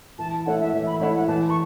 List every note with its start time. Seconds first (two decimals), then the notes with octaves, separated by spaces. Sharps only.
0.19 E3 A5
0.46 A3 E4 C#5 E5 F#5
0.60 E5
0.73 E3 E5
0.87 B5
1.00 A3 E4 C#5 E5 F#5
1.14 F#5
1.28 E3 A5
1.50 C#6